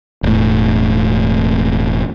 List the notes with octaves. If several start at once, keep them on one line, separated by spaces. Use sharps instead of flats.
E1 A2